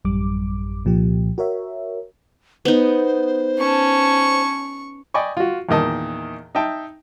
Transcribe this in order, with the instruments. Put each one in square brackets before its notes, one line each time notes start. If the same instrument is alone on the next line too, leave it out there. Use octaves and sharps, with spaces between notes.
[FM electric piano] A1 F#2 G3 D6
C2 A#2 F3 G4
F#4 A#4 C#5 E5
[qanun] B3 D#4 [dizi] C5
[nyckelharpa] C#4 A5 [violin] C#6
[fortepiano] D5 D#5 G5 G#5 B5 C#6
F4 F#4
E2 A#2 D#3 D#5 A5
D#4 D#5 E5 G5 A5